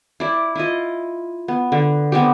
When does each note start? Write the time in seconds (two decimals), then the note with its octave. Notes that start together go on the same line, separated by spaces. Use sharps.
0.20 E4 D5
0.55 E4 F4 D#5
1.48 B3
1.72 D3
2.12 D3 B3 C4 G4